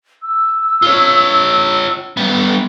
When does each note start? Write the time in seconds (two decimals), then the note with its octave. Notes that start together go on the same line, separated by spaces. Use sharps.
0.23 E6
0.82 F4 C#5
2.17 G3 B3